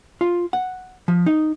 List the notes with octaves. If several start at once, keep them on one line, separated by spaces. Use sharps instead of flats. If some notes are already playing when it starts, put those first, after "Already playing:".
F4
F#5
F3
D#4